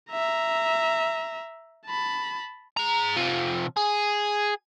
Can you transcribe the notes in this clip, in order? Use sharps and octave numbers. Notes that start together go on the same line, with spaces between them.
E5 A#5
A5 B5
G#4 A#5
C3 F3
G#4